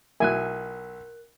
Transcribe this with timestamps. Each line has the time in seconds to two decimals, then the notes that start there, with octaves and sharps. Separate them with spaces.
0.20 B1 E4 A#4 G#5 F#6